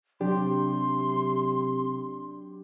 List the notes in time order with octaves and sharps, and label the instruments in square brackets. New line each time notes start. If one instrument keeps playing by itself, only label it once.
[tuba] C3 [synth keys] F#3 D4 G4 [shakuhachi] C6